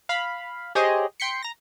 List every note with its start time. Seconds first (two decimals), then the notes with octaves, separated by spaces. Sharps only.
0.09 F5 B5
0.75 G4 G#4 C5 C#5 D#5
1.20 G5 C6 B6 C#7
1.43 A#5 A#6